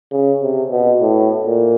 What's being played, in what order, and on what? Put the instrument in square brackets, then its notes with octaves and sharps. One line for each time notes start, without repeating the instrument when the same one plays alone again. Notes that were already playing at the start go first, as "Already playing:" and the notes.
[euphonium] C#3
C3
B2
A2
A#2